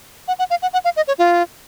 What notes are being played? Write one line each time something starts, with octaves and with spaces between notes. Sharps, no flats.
F#5
F#5
F5
F#5
F#5
F5
D#5
C#5
F4